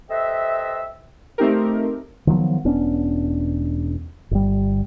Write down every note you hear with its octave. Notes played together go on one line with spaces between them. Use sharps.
G4 A4 B4 C5 D#5 E5
A3 C4 D#4 G4 A#4
D#3 F3 F#3 B3
E1 B3 C#4 D4
G1 G3